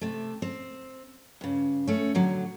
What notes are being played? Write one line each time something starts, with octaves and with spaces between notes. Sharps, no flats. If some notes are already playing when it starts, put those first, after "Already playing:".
C3 A3
C4
G2 C#3
A3 C#4
A2 D3 F#3